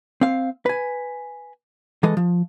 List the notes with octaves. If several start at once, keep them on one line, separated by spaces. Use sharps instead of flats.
C4 F5
B4 G#5
E3 G#3 A4 D#5
F3